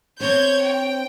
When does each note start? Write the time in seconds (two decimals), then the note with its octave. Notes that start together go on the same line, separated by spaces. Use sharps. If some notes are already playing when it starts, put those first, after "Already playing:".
0.20 C4 D4 C5 C#5 G6 G#6
0.61 G5